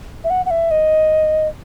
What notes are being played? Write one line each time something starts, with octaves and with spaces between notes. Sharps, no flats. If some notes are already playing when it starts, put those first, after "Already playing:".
E5
F#5
F#5
E5
D#5